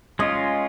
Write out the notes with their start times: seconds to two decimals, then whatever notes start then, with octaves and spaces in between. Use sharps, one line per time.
0.19 G#3 C#4 F4 D#5